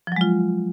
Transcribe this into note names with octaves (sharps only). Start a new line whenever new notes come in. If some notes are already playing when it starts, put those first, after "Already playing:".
F3 F#3 G#3 F4